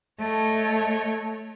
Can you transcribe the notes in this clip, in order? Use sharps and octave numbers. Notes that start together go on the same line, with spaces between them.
A3 C#5 D#5